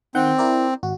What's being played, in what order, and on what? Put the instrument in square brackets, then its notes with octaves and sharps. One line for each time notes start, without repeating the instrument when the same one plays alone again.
[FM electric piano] D#3 F#5 G6 [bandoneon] C4
[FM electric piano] E4 A#4 D5
G#1 F#4